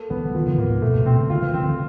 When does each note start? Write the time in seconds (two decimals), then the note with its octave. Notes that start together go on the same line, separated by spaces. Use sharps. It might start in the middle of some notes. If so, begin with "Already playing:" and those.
Already playing: A#3 A4
0.10 E3 B3
0.25 E3
0.34 D#3 F3
0.47 C#3
0.58 A2 A#3
0.70 G#2
0.82 A#2 A3
0.89 C3
0.95 B2
1.06 B2 C4
1.18 C#3
1.30 D3 F4
1.42 E3
1.54 D#3 C4
1.60 C#3
1.65 D3